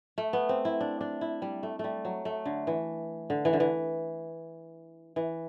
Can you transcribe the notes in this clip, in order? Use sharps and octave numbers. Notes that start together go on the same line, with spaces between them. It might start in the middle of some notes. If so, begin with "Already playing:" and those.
A3
B3
C4
E4
D4
D4
E4
G3
A3
G3 A3
F#3
A3
D3
E3
D3
E3
D3
E3
E3